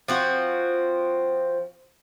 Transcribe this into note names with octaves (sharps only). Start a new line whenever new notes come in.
F3 C4 F#4